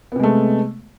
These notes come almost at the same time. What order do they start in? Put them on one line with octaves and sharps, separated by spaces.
B3 C3 G#3 A3